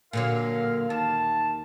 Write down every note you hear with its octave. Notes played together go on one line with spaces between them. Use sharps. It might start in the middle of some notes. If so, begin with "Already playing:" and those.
A#2 D3 F#3 A#4 F5
D#2 A5